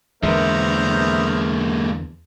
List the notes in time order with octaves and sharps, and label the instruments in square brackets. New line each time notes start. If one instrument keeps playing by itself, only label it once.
[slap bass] E2 D3 [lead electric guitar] G#3 A#3 [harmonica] B3 A#4 C5 [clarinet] E5